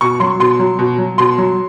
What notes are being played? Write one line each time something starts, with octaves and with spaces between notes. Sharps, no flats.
B2 C#6
F#3 C6
B2 C6
F#3
B2
F#3
B2 C6
F#3